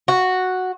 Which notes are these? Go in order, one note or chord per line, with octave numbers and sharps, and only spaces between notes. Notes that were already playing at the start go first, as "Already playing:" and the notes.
F#4